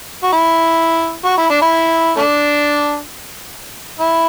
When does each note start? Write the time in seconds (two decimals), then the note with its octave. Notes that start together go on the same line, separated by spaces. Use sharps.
0.23 F#4
0.32 E4
1.25 F#4
1.37 E4
1.50 D4
1.62 E4
2.16 A3 D4
3.99 E4